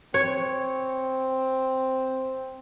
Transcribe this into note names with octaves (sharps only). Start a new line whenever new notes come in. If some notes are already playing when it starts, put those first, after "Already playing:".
C4 C#5